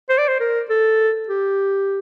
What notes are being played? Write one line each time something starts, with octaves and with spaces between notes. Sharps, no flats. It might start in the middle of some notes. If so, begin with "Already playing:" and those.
C5
D5
C5
A#4
A4
G4